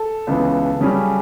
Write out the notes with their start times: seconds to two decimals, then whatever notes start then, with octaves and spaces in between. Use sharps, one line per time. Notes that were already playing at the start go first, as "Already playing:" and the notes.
Already playing: A4
0.27 C#2 C#3 E3 B3
0.80 F#2 C#3 G3 C#4